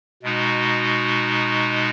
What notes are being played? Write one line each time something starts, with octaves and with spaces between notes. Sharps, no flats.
B2 G#3 D#4 F#4